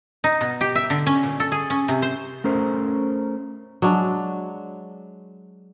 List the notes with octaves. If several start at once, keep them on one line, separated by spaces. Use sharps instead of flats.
D#4
B2
G4
E5
D3
C#4
A#2
A4
G#4
C#4
C3
C5
A3 C#4 A#4 C5
F#3 G#3 D4